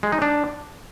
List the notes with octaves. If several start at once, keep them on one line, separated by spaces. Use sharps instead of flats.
G#3
D#4
D4